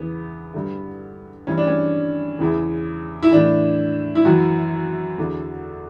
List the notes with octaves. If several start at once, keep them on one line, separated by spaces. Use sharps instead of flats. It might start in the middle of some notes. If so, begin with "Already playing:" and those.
Already playing: E2 C#3 E3 B3
G2 D3
G2 E3 C#4
D4
C#4
E2 C#3 E3
E4
A2 E3 D4
E4
F#2 E3 F#4
E2 D3